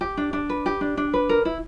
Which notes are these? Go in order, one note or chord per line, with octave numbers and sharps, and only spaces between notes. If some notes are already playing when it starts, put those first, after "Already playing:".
G4
D4
D4
B4
G4
D4
D4
B4
A#4
E4